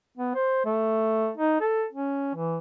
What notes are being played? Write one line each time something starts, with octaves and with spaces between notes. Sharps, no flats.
B3
C5
A3
D#4
A4
C#4
E3